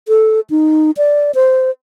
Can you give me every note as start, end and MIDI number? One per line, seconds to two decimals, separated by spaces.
0.08 0.40 69
0.50 0.91 63
0.97 1.31 74
1.35 1.71 72